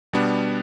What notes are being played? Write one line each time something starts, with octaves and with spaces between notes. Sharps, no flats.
B2 G3 B3 D4